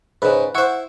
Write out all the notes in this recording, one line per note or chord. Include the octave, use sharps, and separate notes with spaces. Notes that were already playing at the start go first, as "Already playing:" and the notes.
G#2 C#3 B4
E4 C5 F#5 C#6